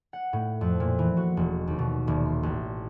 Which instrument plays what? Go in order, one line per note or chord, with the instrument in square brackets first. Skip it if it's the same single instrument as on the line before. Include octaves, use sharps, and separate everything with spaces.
[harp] F#5
A2
F2
A#2
E3
F#4
E1
D#2
B2
D#1
C6
A1